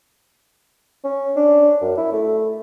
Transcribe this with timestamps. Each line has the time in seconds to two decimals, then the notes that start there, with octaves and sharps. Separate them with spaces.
1.04 C#4
1.36 D4
1.81 F#2
1.97 E4
2.12 A3